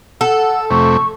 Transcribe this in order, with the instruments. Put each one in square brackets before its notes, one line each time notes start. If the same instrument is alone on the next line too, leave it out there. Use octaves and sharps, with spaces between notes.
[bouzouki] A4 [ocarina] F#5 [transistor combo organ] E6
[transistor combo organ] F2 C3 A3 [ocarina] C#6